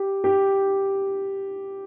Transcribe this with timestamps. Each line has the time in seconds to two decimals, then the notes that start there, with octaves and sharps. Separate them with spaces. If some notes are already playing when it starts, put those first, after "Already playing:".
Already playing: G4
0.24 G4